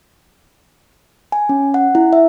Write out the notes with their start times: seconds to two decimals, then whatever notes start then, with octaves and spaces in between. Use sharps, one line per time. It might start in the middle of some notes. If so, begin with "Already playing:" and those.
1.32 G#5
1.49 C#4
1.74 F#5
1.95 E4
2.13 E5